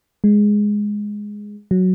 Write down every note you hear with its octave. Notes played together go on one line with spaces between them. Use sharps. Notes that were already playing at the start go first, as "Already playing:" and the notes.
G#3
F#3